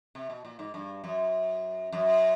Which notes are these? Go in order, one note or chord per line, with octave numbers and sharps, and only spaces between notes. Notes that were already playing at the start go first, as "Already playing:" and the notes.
C3
B2
A#2
G#2
G2
F#2
F#2